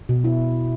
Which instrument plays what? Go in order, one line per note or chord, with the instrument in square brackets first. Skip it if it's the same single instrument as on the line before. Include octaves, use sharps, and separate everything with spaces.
[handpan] B2
E4